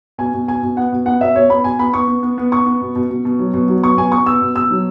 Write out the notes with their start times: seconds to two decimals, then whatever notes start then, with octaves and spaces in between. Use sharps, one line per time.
0.18 B2 G#5
0.34 B2
0.47 B2 G#5
0.63 B2
0.77 B3 F#5
0.92 B2
1.06 B3 F#5
1.21 B2 E5
1.35 B2 C#5
1.49 B3 B5
1.64 B2 G#5
1.79 B3 B5
1.93 B3 C#6
2.08 B3
2.23 B3
2.38 B3
2.52 B3 C#6
2.66 B3
2.81 B2
2.95 B2
3.10 B2
3.25 B2
3.39 F#3
3.54 B2
3.69 F#3
3.83 B3 C#6
3.97 B2 G#5
4.12 B3 C#6
4.26 B2 E6
4.41 B2
4.56 B2 E6
4.71 F#3